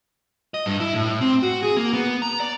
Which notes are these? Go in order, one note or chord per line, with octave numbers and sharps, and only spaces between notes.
D#5
G2
E4
A2
C4
F#4
G#4
A#3
B3
A#5
D5